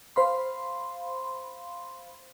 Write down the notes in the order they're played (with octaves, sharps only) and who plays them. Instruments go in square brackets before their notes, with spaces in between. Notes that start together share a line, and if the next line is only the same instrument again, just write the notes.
[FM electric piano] C5 F5 B5 C6